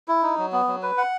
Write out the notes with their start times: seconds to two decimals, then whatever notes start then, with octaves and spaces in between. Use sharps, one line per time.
0.08 E4
0.23 D#4
0.38 F#3
0.52 B3
0.68 F#3
0.83 B4
0.98 F#5